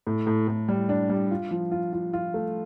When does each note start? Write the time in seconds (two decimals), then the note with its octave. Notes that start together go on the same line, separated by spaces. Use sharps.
0.07 A2
0.27 A2
0.48 A2
0.68 G3
0.89 D4
1.09 G3
1.31 F4
1.51 F3
1.71 F4
1.93 F4
2.13 F4
2.34 A3